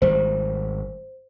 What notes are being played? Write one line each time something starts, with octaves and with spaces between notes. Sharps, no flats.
G#1 G3 C5